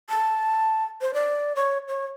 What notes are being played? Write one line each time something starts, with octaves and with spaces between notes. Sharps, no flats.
A5
C5
D5
C#5
C#5